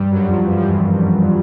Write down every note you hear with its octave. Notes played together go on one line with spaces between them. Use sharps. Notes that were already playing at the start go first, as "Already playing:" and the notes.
Already playing: G2 G3
F#2 F#3
F2 F3
E3
F3
E2 E3